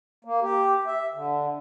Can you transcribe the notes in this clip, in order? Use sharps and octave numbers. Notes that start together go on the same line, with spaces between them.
A#3
G4
E5
D3